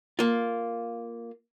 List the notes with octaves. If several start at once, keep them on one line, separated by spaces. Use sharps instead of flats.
A#3 F4